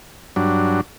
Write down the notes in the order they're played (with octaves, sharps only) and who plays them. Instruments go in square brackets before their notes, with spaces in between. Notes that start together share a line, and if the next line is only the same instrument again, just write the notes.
[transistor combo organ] G2 F#3 D4